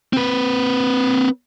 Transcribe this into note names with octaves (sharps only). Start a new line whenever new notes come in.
C4 B4